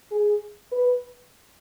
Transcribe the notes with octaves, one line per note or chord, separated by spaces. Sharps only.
G#4
B4